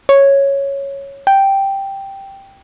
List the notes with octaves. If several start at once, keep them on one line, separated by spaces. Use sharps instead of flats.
C#5
G5